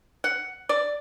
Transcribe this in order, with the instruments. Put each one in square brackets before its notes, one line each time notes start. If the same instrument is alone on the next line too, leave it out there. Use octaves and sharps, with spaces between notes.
[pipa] F#5
D5